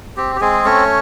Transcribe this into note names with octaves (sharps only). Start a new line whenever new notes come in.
C4 G4
G4
G#3 C4 G#4
A3 C#4 C#5